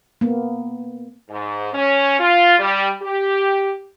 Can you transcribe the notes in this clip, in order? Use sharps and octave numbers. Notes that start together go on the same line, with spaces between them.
A#3 B3
G#2
C#4
F4
G3
G4